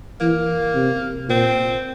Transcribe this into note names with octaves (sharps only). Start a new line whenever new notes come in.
E3 A#3
C3
A#2 C4